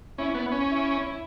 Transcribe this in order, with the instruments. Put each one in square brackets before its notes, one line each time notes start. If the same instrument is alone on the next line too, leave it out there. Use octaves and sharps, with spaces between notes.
[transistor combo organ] C#4 [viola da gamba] E4
[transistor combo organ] B3
C#4
[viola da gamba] E4